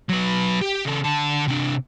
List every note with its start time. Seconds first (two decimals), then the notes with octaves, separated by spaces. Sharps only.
0.09 F#3 B4
0.61 G4
0.85 C#3 A4
1.04 D3 A5
1.48 C3 D4